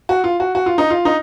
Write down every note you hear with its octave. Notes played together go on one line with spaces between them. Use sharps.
F#4
F4
F#4
F#4
F4
D#4
F4
D#4